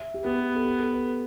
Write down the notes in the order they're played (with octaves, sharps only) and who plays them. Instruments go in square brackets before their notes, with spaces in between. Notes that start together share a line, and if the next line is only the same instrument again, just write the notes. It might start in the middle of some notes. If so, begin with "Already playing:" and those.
Already playing: [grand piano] E5
G4
[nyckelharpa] B3 [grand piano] G4
[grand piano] G4
A4
G4
A4
B4